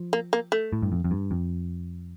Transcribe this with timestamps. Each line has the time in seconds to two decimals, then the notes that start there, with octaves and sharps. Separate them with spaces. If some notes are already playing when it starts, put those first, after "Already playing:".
Already playing: F3
0.13 A#3
0.33 A#3
0.52 A3
0.73 A2
0.82 G2
0.92 F2
1.04 F2
1.11 G2
1.31 F2